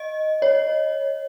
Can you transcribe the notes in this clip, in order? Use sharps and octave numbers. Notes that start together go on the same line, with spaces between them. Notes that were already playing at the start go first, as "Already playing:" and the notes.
Already playing: D#5
C#5